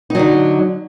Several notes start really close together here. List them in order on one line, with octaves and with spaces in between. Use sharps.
D#4 F#3 D3